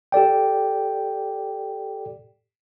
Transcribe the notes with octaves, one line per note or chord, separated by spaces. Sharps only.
G4 A4 D5 G5